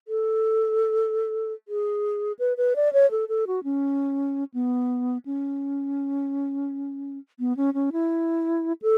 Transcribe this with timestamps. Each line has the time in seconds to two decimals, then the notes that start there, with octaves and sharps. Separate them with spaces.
0.08 A4
1.68 G#4
2.39 B4
2.57 B4
2.76 D5
2.93 C#5
3.11 A4
3.29 A4
3.47 F#4
3.64 C#4
4.54 B3
5.26 C#4
7.40 B3
7.57 C#4
7.74 C#4
7.92 E4
8.82 A4